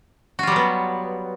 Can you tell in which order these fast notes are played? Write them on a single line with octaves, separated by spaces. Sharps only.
F#4 F4 G3 F#3 B3